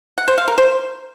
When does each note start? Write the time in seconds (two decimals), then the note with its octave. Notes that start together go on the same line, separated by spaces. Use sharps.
0.18 F#5
0.28 C5
0.38 F5
0.48 A#4
0.58 C5